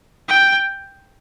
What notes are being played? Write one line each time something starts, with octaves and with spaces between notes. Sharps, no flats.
G5